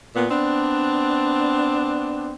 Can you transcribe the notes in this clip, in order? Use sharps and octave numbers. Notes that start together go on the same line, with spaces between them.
A#2 B3
B3 C4 D4